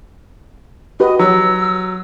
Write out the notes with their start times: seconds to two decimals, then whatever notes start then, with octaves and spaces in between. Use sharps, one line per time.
1.00 F#4 G4 B4 D#5
1.19 F#3 E6